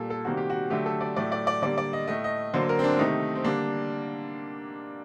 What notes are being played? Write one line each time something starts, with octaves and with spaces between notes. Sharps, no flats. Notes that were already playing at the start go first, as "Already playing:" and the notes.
Already playing: A#2 G3 A#3 A4
A4
C3 D#3 G3 A#3 F#4
G4
F#4
D3 F#3 A3 G4
A4
D5
A2 F#3 A3 D5
D5
D5
D3 G3 A#3 D5
D5
D#5
A2 A3 D#5
D#5
D3 F#3 A#3 C5
A#4
C4
D4
C3 D#3 A3 D#4
C4
D3 G3 A#3 D4